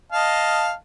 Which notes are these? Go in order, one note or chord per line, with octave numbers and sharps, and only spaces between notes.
D#5 F5 A5